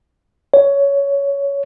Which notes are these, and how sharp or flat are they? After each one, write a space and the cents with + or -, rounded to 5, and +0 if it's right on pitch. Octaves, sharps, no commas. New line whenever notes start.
C#5 +15